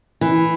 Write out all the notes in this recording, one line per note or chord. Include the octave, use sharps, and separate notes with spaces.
E3